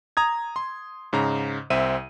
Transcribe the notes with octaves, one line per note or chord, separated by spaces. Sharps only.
A#5 D#6 G#6
C6
G#2 C#3 A#5
C2 C4 E5 D#7